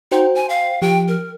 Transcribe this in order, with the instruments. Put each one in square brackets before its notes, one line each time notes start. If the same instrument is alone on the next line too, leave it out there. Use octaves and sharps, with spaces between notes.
[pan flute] D#4 [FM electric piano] F#4 C5 G5
[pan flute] G#5
F5
[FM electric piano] F3 G4 [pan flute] G5
[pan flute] A#4